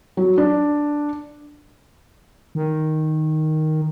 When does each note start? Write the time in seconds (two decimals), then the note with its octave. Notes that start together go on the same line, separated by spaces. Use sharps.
0.17 F#3
0.38 D4
2.55 D#3